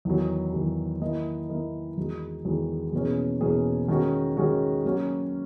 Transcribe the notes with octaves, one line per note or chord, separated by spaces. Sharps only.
E2 D#3 F#3
E2 D#3 F#3
D#3 A#3 E4 A#4 D#5
D#3 A#3 E4 A#4 D#5
E2 D#3 G#3 D#4 F#4
E2 D#3 G#3 D#4 F#4
E2 B2 A#3 C#4 G#4
E2 B2 A#3 C#4 G#4
D#3 G#3 C#4 F#4
D#3 G#3 C#4 F#4
F#3 A#3 C#4 F#4